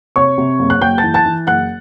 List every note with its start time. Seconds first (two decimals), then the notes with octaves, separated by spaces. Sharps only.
0.16 C3 C#5 C#6
0.38 C3
0.59 F#1
0.70 F#6
0.81 F#1 G5 G6
0.98 A5 A6
1.03 E3
1.14 A5 A6
1.26 E3
1.47 F#1 F#5 F#6